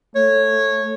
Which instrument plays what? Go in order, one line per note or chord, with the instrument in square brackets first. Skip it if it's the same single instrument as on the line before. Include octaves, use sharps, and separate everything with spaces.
[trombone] A3 [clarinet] C#5